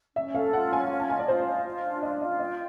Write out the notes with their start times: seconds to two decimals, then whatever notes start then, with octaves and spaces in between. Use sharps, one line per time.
0.16 C#4 E5
0.34 A4 F5
0.53 F4 F#5
0.72 C#4 G#5
0.91 F4
1.00 A5
1.10 D#5 G#5
1.19 D5
1.28 F4 C5
1.46 D#5
1.66 F4
1.84 D4
2.03 F4 D#5
2.21 F4 D#5
2.40 D#5 G5